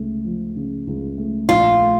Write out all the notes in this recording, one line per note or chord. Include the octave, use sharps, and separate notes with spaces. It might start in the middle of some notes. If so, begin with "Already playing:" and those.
Already playing: C#2 A3
F3
C#3
C#2
A3
A#1 F4
A3